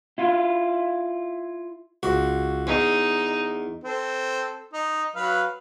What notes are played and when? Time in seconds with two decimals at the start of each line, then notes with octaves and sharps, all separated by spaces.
0.18 E4 F4
2.03 C#2 F#4
2.67 E2 D#4
3.84 C4 A4
4.73 D#4
5.16 F#3 B4 F5